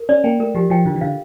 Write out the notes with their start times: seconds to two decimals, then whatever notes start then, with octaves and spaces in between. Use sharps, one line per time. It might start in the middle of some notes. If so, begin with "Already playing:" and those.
Already playing: A#4
0.09 C#4 D5
0.24 A#3 G5
0.40 A3 A#4
0.55 F3 G4
0.70 F3 G5
0.86 D3 F4
0.96 E3
1.01 D3 F5